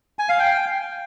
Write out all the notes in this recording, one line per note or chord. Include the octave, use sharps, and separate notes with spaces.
G#5
F5
G5